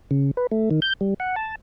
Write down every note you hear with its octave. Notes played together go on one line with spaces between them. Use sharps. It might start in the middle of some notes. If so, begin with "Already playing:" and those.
C#3
B4
A3
D#3
G6
G3
F#5
A5